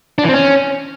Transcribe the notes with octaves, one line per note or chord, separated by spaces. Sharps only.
D4
E3
C4
C#4